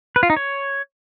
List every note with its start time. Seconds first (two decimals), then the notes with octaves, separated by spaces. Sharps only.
0.16 B4
0.23 F4
0.30 D#4
0.37 C#5